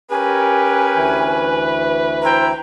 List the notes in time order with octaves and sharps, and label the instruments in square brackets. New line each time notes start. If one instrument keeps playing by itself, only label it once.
[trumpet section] C#4 G4 A#4 [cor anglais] B4 [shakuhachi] G#5
[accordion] D2 E3
[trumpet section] E4 C5 G5 [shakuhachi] A#5